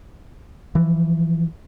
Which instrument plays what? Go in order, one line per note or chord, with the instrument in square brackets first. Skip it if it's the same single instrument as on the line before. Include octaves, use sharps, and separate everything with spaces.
[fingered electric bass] E3 F3